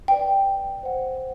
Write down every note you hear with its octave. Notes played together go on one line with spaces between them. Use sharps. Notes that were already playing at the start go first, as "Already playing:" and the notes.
B4 D5 G5
C5 F#5